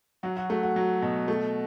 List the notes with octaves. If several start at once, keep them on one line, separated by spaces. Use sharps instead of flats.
F#3 F#4
F#4
A3 F#4
F#4
F#3
B2
A3